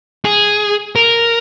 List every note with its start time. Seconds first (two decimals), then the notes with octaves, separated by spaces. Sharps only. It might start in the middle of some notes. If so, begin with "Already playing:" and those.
0.25 G#4
0.96 A#4